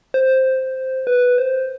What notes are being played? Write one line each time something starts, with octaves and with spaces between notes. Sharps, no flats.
C5
B4
C5